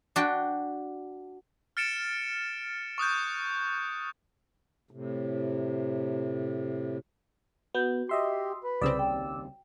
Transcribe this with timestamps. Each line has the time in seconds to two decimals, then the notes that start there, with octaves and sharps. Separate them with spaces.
0.16 D4 F#4 G5
1.77 F6 A6 C#7 D7 E7
2.98 C#6 D#6 F#6 G6
4.91 A2 C3
7.74 B3 F#4 G6
8.09 G4 D#5 E5 C6
8.64 B4
8.81 C2 C#3 C4 D5 D#6 E6
8.99 D#2 G5